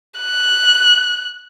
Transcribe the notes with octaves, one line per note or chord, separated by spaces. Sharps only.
F#6